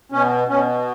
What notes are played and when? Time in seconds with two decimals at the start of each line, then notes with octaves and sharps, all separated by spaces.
0.12 B2 C#4
0.48 B2 C#4